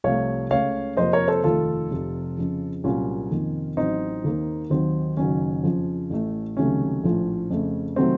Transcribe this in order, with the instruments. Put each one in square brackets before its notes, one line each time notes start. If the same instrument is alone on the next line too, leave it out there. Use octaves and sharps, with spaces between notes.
[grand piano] C2 C3 F3 A3 C#5 F5
C#2 C#3 A3 C#5 F5
F2 C3 F3 A#3 C5 D#5
A#4 C#5
A4 C5
F1 D#2 D#3 A3 F4 A4
F1 F2 C3
F2 C#3 F3
C2 A#2 F#3 A#3 C#4 F4
F2 C3 D#3 A#3
A1 A2 F#3 C4 D#4
D#2 D#3 A#3
D#2 D#3 F#3 C4
F#1 F#2 D#3 F#3 C#4
F2 C#3 F3
A1 A2 A3
C#2 C3 D#3 F#3 A3 C#4
A#1 A2 F3 A3
F2 C#3 A3
C3 D#3 F#3 A3 C4